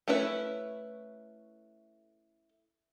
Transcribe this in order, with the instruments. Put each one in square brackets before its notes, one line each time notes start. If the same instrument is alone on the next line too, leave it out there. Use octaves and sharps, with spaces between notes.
[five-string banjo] A3 C#4 E4 B4